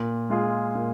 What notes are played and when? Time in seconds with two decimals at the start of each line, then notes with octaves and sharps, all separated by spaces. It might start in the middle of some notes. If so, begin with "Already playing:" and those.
Already playing: A#2
0.30 G#3 F4 G#4
0.75 A#2